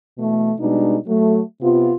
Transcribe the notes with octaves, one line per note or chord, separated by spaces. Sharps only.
B2 E3 A3
B2 G3 G#3 D4 D#4
F#3 A3
C3 B3 F4